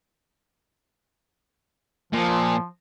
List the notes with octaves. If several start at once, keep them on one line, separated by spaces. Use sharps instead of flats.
A#2 F3